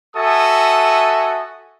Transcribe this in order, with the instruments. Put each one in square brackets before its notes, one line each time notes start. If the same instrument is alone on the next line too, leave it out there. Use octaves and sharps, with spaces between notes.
[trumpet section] F#4 A4 E5 G#5 D#6